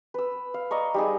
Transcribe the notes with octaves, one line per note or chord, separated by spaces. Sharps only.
B4 E6
F5
D5 D#5 A#5 C#6
G3 D#4 G#4